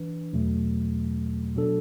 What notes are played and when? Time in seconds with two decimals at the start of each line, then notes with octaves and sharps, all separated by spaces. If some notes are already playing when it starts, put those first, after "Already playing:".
Already playing: E3 D4 B4
0.33 E2 B2 F#3 A3
1.56 B2 F#3 D4 A4